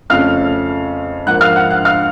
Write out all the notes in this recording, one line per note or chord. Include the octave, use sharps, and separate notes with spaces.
F2 C#3 F3 A3 C#4 F5 F6
G#2 F3 A#3 F#5 F#6
F5 F6
F#5 F#6
F#5 F#6
F5 F6